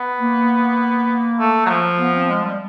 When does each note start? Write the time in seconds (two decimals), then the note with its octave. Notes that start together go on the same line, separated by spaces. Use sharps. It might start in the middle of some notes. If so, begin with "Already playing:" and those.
Already playing: B3
0.20 A#3
1.40 A3
1.66 F#3
1.69 F3
1.99 B3
2.14 C4
2.29 G#3
2.44 G3